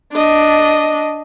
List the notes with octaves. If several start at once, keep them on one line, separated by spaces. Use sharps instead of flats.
D4 D#5